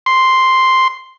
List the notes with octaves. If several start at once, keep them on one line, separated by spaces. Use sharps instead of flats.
C6